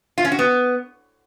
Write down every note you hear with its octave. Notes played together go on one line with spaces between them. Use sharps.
F4
C#4
F#4
B3